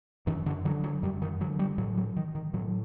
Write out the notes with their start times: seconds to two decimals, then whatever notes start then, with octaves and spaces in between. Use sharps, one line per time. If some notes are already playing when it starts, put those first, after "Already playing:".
0.27 F#2 D#3
0.46 D3
0.65 D3 F#3
0.84 F#3
1.03 F#2 G3
1.22 D#3
1.40 D3 F#3
1.59 G3
1.78 A2 F#3
1.97 F#3
2.16 D#3
2.35 D#3
2.54 A2 F#3